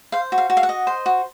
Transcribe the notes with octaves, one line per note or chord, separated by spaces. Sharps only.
C5 F5
F#4
F5
F#4
F5
F#5
D#5
C5
F#4